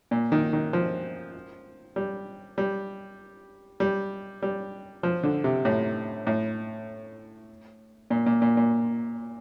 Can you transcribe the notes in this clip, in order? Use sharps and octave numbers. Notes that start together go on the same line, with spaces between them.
A#2
D#3
D#3
F3
G3
G3
G3
G3
F3
D3
C3
A2
A2
A#2
A#2
A#2
A#2